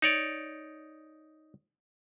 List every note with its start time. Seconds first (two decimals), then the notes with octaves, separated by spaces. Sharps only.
0.02 D#4 C#5 D5